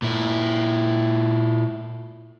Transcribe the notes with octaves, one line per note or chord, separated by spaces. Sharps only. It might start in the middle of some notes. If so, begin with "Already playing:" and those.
A#2 E4